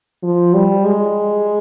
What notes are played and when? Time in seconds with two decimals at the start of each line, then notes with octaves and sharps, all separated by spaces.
0.23 F3
0.54 G3
0.85 G#3